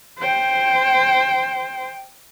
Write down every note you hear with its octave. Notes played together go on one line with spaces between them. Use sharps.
C5 G5